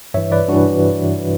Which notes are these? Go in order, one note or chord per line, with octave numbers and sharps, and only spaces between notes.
G2 E3 C#5 E5
B4 D5
G2 E3 D4 F#4